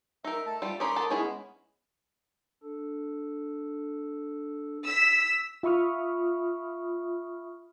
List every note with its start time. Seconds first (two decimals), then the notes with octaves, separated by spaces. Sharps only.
0.24 D#4 A#4 E5
0.46 A3 A4 A5
0.62 G3 F4
0.80 C#4 A#4 B5 C6 D6 D#6
0.96 A4 A#4 A5
1.10 G#3 B3 C#4 E4 G#4 C#5
2.63 D4 A4
4.85 E6 B6
5.63 F4 E5 B5 C#6 D#6 F6